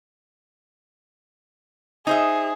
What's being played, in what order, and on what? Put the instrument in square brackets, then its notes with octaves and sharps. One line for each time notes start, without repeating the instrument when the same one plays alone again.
[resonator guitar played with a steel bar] D#4 C5 E5 [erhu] G#4